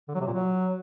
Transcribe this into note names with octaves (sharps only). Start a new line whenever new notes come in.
D3
F#3
C3
A#2
F#3